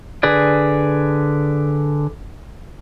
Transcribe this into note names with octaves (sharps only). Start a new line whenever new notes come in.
D3 G#4 B4 D5